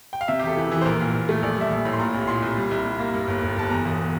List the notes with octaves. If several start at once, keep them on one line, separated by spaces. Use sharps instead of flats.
G5
F5
C3 E5
G4
E1 A4
E3
E3
C5
A#1 A#4
A#2
A#2
A3
A#1 D5
G3 E5
A#1
A2
C6
A#2 A#5
C2
A#2 C6
C2
G3
C2
C2
A#3
G2
G1
G1
G1 A5
E2 A#5
E1